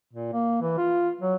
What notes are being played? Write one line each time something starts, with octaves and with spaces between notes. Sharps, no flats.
A#2
A#3
E3
F4
F#3